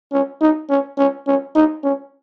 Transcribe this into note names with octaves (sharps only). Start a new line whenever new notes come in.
C#4
D#4
C#4
C#4
C#4
D#4
C#4